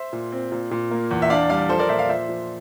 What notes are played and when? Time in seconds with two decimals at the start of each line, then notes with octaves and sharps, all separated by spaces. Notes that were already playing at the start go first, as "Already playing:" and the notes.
Already playing: C5 E5
0.13 A#2
0.32 C4
0.52 A#2
0.71 A#2
0.91 A#3
1.11 E2
1.22 E5
1.30 D4 D5 F5
1.50 G3 D5 F5
1.69 F3 A4 C5
1.79 A#4 D5
1.89 A#2 C5 E5
1.99 D5 F5
2.09 F3 C5 E5
2.29 F3